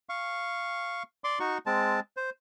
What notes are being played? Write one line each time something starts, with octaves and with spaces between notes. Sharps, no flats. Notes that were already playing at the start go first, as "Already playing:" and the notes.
F5 C#6
D5 C6 D6
D#4 F#4 C#6
G#3 C4 A5
C5